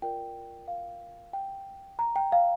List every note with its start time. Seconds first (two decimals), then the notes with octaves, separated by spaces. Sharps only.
0.02 F4 A#4 D5 G5
0.68 F5
1.33 G5
1.99 A#5
2.16 G5
2.32 F5